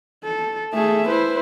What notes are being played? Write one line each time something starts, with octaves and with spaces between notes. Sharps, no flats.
A4
A3 G#4 A4 E5
E4 B4 C5